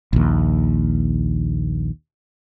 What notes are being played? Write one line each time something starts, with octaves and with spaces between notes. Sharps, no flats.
A#1 D#2